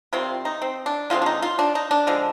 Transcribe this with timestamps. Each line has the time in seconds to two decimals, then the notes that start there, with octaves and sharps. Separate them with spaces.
0.13 C3 D#3 G3 C4 F4
0.45 D#4
0.62 C4
0.86 D4
1.10 D3 G#3 C4 F4
1.22 D4
1.26 D#4
1.42 F4
1.59 D4
1.75 D#4
1.91 D4
2.07 D3 F3 G#3